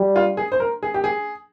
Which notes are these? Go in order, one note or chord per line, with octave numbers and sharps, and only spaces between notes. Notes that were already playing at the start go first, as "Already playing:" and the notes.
Already playing: G3
F4
G#4
C5
A#4
G#4
G4
G#4